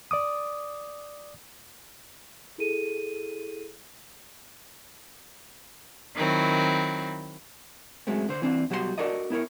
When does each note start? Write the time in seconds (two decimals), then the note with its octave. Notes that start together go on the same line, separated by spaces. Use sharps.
0.11 D5 D6 D#6
2.58 E4 G#4 A4 D#7
6.16 D#3 F#3 C4 E4
8.07 F#2 F#3 G#3 A3 C4
8.29 D3 C5
8.42 E3 C4 D4
8.70 B2 F#3 G3 F#4 A#4 C6
8.98 D4 F#4 A4 A#4 D5 D#5
9.30 B3 E4 A#4 C#5